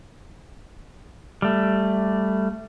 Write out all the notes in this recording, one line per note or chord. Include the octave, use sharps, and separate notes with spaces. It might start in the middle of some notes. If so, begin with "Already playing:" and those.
G3 A3